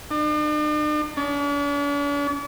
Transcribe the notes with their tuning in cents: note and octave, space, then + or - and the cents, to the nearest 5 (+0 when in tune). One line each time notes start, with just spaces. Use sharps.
D4 +45
D4 -45